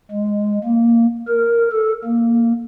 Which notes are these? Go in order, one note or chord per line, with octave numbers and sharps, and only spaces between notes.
G#3
A#3
A#4
A4
A#3